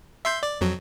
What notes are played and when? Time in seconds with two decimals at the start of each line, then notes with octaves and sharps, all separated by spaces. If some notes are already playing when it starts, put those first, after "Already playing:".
0.25 E5 C6 G6
0.43 D5
0.61 F2 F#3